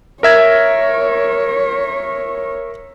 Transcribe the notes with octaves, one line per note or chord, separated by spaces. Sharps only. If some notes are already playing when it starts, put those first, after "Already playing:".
A#4 C#5 E5 G#6